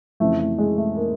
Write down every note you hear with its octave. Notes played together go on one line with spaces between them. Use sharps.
F2 C#3 E3 A3
A3
G#3
A3
A#3